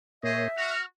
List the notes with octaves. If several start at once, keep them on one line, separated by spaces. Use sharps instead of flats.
A#2 A#3 G#4 C5 C#5 D#5 E5
F#4 F6